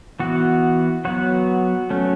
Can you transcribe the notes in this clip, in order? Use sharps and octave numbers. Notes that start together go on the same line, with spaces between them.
E3 B3 F#4
F#3 B3 F#4
F#3 A3 C#4